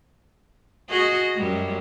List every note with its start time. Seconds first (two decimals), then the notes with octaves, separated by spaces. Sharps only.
0.90 F#4 G#4 D#5
1.35 F#2 G3 G#3